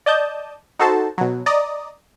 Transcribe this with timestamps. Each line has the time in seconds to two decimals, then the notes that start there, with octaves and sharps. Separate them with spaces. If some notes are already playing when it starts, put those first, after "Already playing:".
0.06 D5 D#5 A5 G6
0.79 D#4 F#4 A4 C5 A5
1.18 B2 F#3
1.46 D5 D#5 A#5 D#6